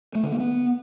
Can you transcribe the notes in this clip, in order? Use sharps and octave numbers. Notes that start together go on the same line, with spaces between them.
A3
D3
A#3
B3